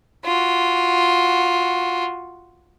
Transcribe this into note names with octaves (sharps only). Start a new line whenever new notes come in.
F4 F#4